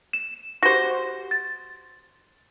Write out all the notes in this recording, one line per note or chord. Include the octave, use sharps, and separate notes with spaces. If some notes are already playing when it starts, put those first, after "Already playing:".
E7
F#4 G4 C5 A#6
A6